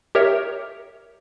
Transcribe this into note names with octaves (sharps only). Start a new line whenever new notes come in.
G4 A#4 C#5 E5